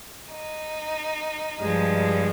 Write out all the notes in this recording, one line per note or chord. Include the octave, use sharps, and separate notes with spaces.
D#4
G2 F3 G#3